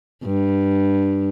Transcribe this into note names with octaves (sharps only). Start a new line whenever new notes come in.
G2